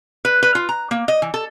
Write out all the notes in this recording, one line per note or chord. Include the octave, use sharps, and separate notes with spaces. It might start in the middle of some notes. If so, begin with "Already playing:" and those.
B4
B4
F4
A#5
A#3
D#5
E3
A4